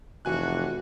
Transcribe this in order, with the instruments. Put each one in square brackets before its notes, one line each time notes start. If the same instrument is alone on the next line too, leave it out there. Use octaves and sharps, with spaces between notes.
[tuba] F1 [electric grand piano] E3 G#5 F#6 [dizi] F#4